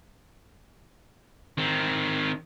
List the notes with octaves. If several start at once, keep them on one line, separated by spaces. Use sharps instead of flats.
D#3 C4